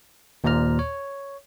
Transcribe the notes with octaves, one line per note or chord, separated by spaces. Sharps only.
D#2 A#2 C5 D5 A#5 F6
C#5